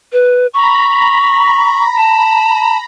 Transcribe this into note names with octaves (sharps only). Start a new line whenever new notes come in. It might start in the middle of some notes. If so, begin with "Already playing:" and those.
B4
A#5 B5 C#6
A5